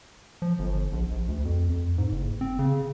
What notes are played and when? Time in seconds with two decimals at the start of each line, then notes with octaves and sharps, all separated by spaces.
0.42 F3
0.59 G1
0.93 A#1
1.11 A#1
1.28 D2
1.45 F2
1.69 F2
1.98 G#2
2.12 F#1
2.41 C4
2.59 C#3